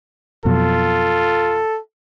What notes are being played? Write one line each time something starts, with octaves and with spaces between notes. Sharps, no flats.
F2 B2 F#3 F4 A4